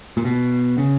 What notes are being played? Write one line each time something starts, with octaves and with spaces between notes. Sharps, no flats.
A#2
B2
C#3